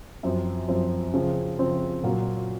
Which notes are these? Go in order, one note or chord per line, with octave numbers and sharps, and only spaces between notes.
F#2 F3 C4
F#2 F3 C4
C#3 F3 C4
C#3 F3 C4
A#2 F#3 A#3 F4